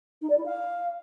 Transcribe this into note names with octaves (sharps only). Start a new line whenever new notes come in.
D#4
D5
E4
F5